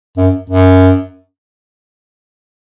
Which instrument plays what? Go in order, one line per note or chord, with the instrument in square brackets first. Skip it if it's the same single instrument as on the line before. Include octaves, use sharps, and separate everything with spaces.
[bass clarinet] F#2
F#2